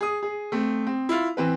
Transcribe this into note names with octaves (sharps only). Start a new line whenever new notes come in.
G#4 D#6
G#4
A3 C4
C4
E4 F4
E3 C4 B4